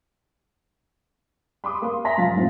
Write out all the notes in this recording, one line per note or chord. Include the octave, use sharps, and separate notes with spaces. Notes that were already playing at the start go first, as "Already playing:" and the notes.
B5 C6 D6 D#6
A#3 C6
E5 G#5 A#5 C6 A#6 B6
F#2 F3 F5 A6
A1 G#2 F3 C4